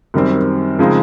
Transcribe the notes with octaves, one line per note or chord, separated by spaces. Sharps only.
F#2 D#3 G3 C4
C#3 F3 G#3 C4 D#4